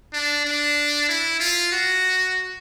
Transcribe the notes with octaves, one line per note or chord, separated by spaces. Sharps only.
D4
D4
E4
F4
F#4